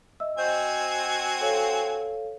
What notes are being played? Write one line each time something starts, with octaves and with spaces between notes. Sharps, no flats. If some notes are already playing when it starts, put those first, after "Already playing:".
D#5 E5 E6
C4 F#4 C5 D#5 G#5 G6
A4 C#5 F5